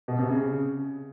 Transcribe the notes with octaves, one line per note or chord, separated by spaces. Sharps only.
B2
C3
C#3